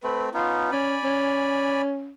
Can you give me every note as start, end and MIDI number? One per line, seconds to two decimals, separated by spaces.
0.04 0.29 57
0.04 0.29 60
0.04 0.28 71
0.34 0.71 59
0.34 0.71 61
0.34 0.71 63
0.34 0.69 65
0.72 0.97 61
0.72 1.82 74
0.72 1.82 80
0.72 1.82 83
1.04 2.13 61